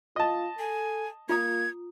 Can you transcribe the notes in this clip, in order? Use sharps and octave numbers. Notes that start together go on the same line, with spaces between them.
F4 D#5 A5
A4 G#5
A#3 F4 A#5 D#6 G#6